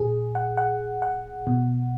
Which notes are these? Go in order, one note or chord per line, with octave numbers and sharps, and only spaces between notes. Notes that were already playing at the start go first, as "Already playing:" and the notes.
Already playing: A#2 G#4
F#5
F#5
F#5
B2